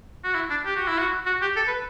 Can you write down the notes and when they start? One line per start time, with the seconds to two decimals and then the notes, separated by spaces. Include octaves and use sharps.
0.24 F#4
0.35 E4
0.50 D4
0.65 G4
0.76 F#4
0.88 E4
0.98 F#4
1.26 F#4
1.42 G4
1.56 A4
1.68 B4